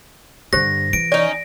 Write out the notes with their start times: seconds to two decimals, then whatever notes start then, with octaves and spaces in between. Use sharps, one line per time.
0.53 G2 D3 G4 C5 A#6
0.93 E3 D7
1.12 C#4 D#4 D5